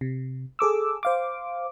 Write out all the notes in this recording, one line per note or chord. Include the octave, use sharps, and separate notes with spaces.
C3
G#4 A4 D6 E6
C5 F5 D6